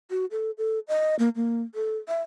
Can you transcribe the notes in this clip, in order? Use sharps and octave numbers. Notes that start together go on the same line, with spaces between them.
F#4
A4
A4
D#5
A#3
A#3
A4
E5